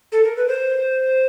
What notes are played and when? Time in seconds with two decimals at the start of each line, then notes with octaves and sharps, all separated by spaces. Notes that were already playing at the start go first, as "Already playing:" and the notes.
0.12 A4
0.24 A#4
0.36 B4
0.48 C5